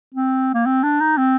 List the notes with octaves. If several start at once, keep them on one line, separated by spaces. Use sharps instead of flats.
C4
A#3
C4
D4
D#4
C4